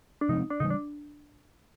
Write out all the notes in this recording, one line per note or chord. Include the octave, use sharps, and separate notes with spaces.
D4
C3 F3 G#3 C4 D#4
D4
C#3 E3 G3 D#4
D4